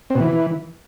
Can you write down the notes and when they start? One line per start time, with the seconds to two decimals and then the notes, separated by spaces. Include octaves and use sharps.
0.10 C4
0.15 B2
0.20 E3